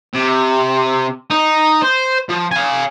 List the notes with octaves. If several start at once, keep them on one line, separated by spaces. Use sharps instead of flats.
C3
D#4
C5
F3
F5 G#5